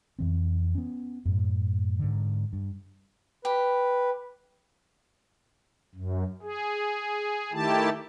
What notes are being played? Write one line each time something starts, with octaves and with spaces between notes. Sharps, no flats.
F2 E3 C4
B3 C#4
F#2 A2
G#2 D3
G2
G4 B4
F#2
G#4
D#3 A3 E4 G4 A5